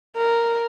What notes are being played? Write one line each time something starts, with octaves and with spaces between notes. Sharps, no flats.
A#4